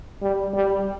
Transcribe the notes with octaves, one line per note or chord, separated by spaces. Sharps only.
G3
G3